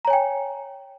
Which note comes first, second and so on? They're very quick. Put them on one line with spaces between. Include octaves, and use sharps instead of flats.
A#5 C#5 G#5 G5